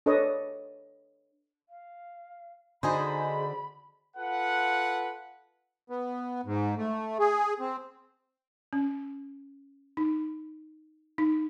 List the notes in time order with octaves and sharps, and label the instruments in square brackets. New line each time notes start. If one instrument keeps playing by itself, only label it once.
[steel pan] D4 A4 B4 C#5 D#5
[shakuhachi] F5
[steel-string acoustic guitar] D3 D4 F#4 [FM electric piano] D#4 G#4 C5 [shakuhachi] B5
[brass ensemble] F4 A4 B4 F#5
[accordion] B3
G#2
A3
G#4
C4
[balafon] C#4
D#4
D#4